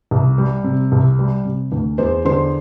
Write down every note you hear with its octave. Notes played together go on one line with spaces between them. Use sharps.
C2
G3
C3
C2
G3
C3
D2
E2 C5
D3 C5 C6